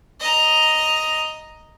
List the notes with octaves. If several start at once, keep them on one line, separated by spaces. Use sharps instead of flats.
D#5 A#5